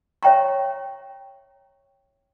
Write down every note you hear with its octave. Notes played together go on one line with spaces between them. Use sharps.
C#5 E5 G5 A#5 C#6